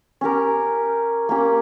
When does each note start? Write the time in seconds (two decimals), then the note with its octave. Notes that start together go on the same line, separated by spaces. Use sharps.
0.21 C#4 G4 A#4
1.29 A#3 C#4 G4